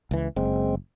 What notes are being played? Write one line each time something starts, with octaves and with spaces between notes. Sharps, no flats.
C#2 E3
F#1 G#3 C4